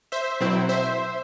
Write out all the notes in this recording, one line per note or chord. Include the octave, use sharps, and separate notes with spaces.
C5 E5
B2 F#3 C4 E4
C5 E5